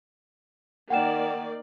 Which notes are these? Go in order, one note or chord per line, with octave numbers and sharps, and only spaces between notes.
D#3 A#3 D5 F#5 G5 E7